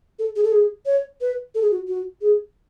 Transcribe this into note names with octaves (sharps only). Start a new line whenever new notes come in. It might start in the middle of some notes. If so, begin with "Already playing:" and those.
A4
G#4
A4
G#4
C#5
B4
A4
G#4
F#4
F#4
G#4